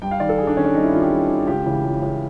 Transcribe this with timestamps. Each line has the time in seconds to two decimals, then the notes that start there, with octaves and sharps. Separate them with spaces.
0.02 G2 G5
0.11 F5
0.20 D#3 D5
0.29 A4
0.38 G2 G#4
0.47 D4
0.57 D#3 C#4
0.65 D4
0.74 G2 D#4
0.83 E4
0.92 D#3 F4
1.02 G4
1.11 G2
1.29 D#3
1.47 C#2 G4
1.65 C#3 E3
1.84 C#2
2.02 C#3 E3